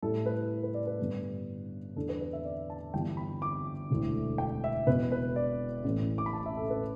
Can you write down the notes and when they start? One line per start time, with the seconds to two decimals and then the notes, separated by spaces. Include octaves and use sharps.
0.02 A2 G3 E4 A4
0.26 B4
0.63 B4
0.74 D5
0.87 B4
0.99 G2 D3 B3
1.96 E2 D3 B3 D4 A4
2.09 B4
2.21 B4
2.33 E5
2.45 D5
2.70 A5
2.94 G1 G2 E3 G3 B3 G5
3.17 B5
3.42 D6
3.91 E1 D2 D3 A3 E4
4.38 G5
4.64 E5
4.87 E1 E2 B2 B4
5.12 B4
5.36 D5
5.84 A1 A2 E3
6.18 D6
6.26 B5
6.33 A5
6.46 E5
6.57 A4
6.70 B4